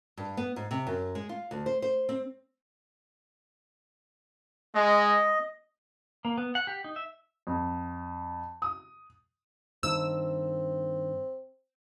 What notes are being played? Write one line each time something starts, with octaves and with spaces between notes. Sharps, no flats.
G2
B3
G#2
C3
F#2
G#3
F4
D2
C5
C5
C4
G#3 D#5
A#3
B3
F#5
G4
D#4
E5
F2
D#6
G2 D#3 C4 E6